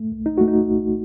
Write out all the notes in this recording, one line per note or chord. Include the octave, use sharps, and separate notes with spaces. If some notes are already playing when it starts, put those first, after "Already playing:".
Already playing: A3
C2
D#4
A3 F#4
D#4
C2